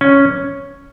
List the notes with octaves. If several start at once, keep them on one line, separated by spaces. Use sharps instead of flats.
C#4